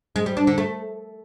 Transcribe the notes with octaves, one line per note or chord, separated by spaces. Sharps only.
G#3
G3
D4
D3
A3